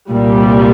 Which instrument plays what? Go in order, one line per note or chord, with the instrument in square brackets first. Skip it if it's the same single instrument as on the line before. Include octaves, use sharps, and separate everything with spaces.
[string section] C2 A#2 G3